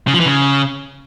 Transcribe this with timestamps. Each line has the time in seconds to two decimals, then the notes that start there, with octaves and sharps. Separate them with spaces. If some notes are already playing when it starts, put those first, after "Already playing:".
0.07 C#3
0.14 F3
0.20 E3
0.26 C#3